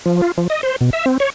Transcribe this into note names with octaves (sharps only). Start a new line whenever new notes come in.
F3
F4
F3
D#5
C5
B2
E5
C4
C#5